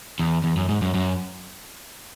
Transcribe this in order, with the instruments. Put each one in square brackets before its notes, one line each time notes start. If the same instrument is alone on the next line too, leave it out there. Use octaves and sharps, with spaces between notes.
[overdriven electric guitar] E2
E2
F#2
G#2
F#2
F#2